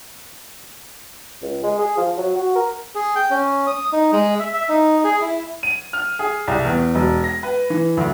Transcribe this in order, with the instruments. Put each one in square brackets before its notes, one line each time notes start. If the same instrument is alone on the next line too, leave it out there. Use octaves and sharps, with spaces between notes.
[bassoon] C#2
G#3
G#4
F3
F#3
F#4
A#4
[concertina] G#4
G5
C#4
D#6
D#4
G#3
E5
E5
D#4
G#4
E4
[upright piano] D#7
F6
G#4
C2
E2
E1
A#6
B4
E3
D2